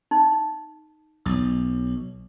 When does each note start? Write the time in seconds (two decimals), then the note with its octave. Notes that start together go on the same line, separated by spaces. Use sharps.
0.11 D#4
1.26 B1 D#6